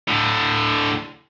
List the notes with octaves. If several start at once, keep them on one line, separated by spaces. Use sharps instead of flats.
A2 D3